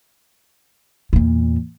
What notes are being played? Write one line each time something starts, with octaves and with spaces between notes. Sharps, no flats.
E2 A#2